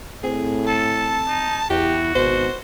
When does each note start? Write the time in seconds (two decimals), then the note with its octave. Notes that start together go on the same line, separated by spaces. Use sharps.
0.24 A2 C4 G#4
0.67 A4 A5
1.28 D#4
1.70 E2 E4 F#4 G4
2.15 G#1 B2 C5